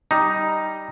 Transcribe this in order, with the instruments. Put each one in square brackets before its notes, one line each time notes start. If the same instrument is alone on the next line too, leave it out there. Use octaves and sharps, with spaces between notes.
[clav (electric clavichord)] G3 D#4